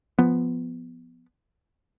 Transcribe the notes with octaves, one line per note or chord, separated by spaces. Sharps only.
F3 B3